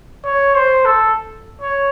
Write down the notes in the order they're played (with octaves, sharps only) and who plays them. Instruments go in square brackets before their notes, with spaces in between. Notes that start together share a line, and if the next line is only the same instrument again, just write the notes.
[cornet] C#5
C5
A4
C#5